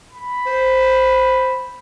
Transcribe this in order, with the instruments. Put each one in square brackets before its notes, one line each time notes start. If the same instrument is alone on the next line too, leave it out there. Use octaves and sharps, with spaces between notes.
[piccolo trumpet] B5
[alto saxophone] C5